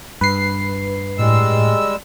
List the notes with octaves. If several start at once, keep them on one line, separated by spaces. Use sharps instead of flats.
G2 B4 C7
A2 G3 G#3 E6